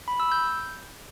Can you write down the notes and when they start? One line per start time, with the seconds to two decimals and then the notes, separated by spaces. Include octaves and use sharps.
0.08 B5
0.20 E6
0.32 G6